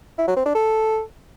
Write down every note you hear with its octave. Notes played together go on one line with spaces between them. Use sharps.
E4
F#3
C4
D4
A4